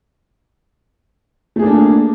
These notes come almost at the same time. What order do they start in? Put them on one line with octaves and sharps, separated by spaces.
A3 G#4 A#3 D4